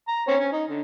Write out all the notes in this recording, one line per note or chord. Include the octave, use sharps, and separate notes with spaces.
A#5
C4 C#4 C#5
C#4
D#4
D3